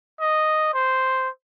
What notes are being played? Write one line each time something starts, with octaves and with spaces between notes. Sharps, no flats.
D#5
C5